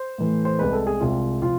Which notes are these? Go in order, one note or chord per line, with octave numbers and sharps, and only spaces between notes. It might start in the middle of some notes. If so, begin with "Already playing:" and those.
Already playing: C5
A2 E3 A3
C5
C2 C3 G#3 B4
A4
G#4
C2 C3 G#3 F4
C3 F3 F4